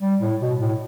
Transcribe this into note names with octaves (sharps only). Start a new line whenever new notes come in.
G3
A2
B2
A2